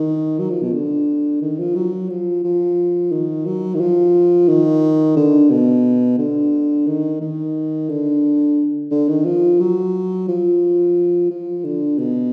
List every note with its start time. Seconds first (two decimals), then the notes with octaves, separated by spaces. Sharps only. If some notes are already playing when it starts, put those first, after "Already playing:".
Already playing: D#3
0.39 F#3
0.50 F3
0.62 B2
0.73 D3
1.41 D#3
1.59 F3
1.75 F#3
2.09 F3
2.43 F3
3.12 D#3
3.46 F#3
3.75 D#3
3.80 F3
4.48 D#3
5.16 D3
5.51 B2
6.18 D3
6.87 D#3
7.21 D#3
7.89 D3
8.91 D3
9.08 D#3
9.25 F3
9.60 F#3
10.28 F3
11.30 F3
11.64 D3
11.98 B2